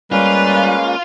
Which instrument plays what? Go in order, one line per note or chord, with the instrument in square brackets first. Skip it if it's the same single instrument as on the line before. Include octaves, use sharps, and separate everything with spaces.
[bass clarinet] G3 [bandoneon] G#3 A#3 C#4 [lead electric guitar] F4 [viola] B4